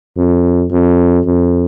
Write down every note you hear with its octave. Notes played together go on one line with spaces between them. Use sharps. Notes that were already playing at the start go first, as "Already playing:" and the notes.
F2
F2
F2